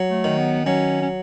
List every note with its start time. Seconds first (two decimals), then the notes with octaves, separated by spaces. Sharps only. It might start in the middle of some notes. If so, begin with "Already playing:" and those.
Already playing: F#3
0.10 A3
0.24 D#3
0.38 B3
0.66 F#3 C#4
1.02 C#4